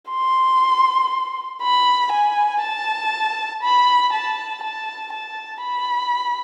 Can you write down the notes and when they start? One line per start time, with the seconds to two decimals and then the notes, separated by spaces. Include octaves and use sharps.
0.11 C6
1.62 B5
2.12 G#5
2.62 A5
3.63 B5
4.13 A5
4.63 A5
5.13 A5
5.63 B5